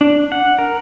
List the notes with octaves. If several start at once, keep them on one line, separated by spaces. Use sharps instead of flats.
D4
F#5
A#4